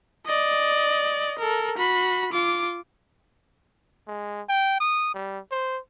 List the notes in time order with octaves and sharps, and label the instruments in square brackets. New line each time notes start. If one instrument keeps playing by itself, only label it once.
[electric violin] D5 D#5
A4 A#4
F#4 B5
F4 D6
[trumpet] G#3
G5
D#6
G3
C5